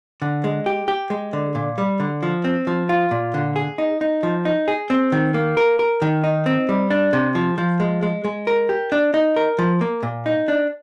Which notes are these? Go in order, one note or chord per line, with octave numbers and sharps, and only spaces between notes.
D3
G#3
G4
G4
G#3
D3
A#2
G3
D3
F3
C4
F3
F4
A#2
D3
G#4
D#4
D#4
F3
D#4
G#4
C4
D#3
A#3
A#4
A#4
D#3
D#4
C4
G3
D4
C3
F3
F3
G#3
G#3
G#3
A#4
G4
D4
D#4
A#4
F3
A#3
A#2
D#4
D4